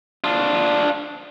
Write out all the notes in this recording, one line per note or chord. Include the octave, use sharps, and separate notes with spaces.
D4 F4